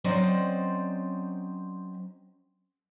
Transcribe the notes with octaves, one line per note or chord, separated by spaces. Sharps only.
F#3 C4 C#4 C5 D5 D#5